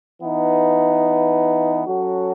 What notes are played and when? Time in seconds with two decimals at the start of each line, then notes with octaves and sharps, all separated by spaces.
0.21 E3 B3 D#4
1.85 F#3 C#4 F#4 A4